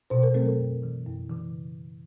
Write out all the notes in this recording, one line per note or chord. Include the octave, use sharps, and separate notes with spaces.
B2 C5
A#4
F#3 A3 C4 A4
A#4
F#2
C#3 E3
F#2
C#3 E3